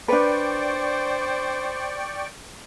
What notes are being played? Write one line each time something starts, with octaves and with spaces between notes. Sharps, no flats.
D4 B4 C5 D5 G5 C#6